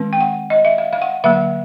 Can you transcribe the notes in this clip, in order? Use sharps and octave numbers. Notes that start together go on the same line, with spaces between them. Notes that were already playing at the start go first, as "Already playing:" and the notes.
Already playing: D#3 G#3 C4
G5
F#5
D#5
E5
F5
F5
F#5
D3 F#3 A#3 E5